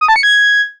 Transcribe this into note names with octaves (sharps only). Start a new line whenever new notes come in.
D#6
A5
C#7
G#6